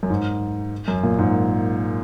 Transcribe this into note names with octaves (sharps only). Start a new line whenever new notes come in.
F#2
G#2
F#2
A#2
G#2